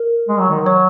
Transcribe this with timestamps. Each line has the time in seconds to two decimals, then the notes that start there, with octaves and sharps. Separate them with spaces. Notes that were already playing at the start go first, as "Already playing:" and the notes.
Already playing: A#4
0.29 G#3
0.39 F#3
0.50 D#3
0.61 F#3 C#5